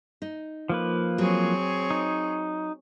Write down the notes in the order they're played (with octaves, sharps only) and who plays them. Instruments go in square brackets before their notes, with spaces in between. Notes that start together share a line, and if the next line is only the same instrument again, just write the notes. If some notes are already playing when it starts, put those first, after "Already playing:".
[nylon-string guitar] D#4
[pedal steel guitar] F3 A#3 B4
[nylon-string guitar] F#3 [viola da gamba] C4 G#4 C#5
[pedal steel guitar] D#4